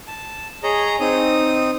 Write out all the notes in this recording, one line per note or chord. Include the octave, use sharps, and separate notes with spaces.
A5
G#4 C#5 D#5 A#5
C4 D#4 D#6